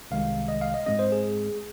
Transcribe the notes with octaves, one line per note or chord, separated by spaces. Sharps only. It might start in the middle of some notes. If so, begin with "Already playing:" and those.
C2 C3 D#3 G#3 F5
D#5
F5
D#5
G#2 G#3 C4 D#5
C5
G#4